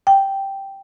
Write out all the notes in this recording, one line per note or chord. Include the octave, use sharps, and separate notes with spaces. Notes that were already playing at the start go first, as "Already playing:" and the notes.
G5